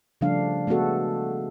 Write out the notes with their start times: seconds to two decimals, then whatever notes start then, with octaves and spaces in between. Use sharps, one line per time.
0.21 C#3 F3 G3 A3 D4 F5
0.67 G#3 A3 B3 F#4 A4